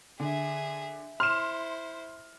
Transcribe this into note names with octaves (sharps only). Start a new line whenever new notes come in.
D3 G#4 E5
E4 C5 C6 F6 E7